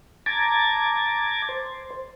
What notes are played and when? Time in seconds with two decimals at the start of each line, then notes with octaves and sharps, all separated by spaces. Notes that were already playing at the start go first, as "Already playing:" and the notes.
0.26 A5 A#5 D6 G#6 A6
1.49 C5